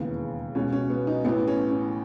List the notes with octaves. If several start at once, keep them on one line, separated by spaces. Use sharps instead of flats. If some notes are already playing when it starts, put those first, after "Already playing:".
Already playing: E1 D#2 C#3 E3 B3
C#2 B2 C#4
C#4
B3
D#4
A1 A2 E3 B3
C#4
C#4